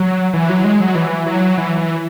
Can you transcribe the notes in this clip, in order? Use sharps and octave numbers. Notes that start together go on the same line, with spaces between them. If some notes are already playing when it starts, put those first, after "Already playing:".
Already playing: F#3
E3
F#3
G#3
F#3
E3
F#3
E3
E3